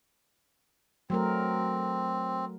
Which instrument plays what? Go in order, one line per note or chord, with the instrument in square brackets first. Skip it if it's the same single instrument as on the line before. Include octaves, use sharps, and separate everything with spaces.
[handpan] F#3 A3 A#4 [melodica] C4